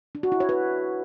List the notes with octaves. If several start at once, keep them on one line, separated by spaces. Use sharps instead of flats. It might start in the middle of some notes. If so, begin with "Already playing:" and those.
D4
F#4
E4
C#5
B4